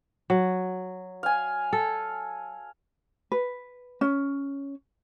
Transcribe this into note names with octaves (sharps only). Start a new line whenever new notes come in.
F#3
F5 G#5
A4
B4
C#4